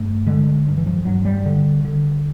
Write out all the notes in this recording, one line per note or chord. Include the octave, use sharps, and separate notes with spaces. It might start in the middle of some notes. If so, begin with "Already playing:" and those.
Already playing: G2 A3
D3 G#3
G2
E3
F3
G2 F#3
G3
D3
D3